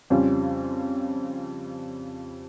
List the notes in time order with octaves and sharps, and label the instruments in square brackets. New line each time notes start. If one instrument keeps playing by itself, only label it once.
[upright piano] F2 C#3 G3 C#4 F4